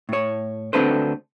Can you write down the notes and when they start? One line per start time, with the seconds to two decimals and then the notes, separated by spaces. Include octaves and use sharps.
0.09 A2 C#5
0.73 D2 C4 D4 A4 B4 C5